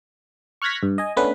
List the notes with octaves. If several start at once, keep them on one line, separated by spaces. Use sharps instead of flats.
C#6 F6 F#6 G#6 A#6 B6
G2
D#5 G#5
A3 B3 C#4 D4 B4